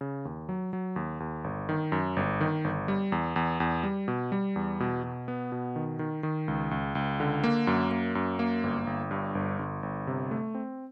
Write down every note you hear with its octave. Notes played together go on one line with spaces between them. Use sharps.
C#3
D#2
F#3
F#3
D#2
D#2
G1
D#3
F#2
G1
D#3
G1
G3
E2
E2
E2
G3
B2
G3
E2
B2
B2
B3
B2
D#3
D#3
D#3
C#2
C#2
C#2
D3
A#3
F#2
A#3
F#2
A#3
G1
G1
G2
G1
G1
G1
C3
A3
C4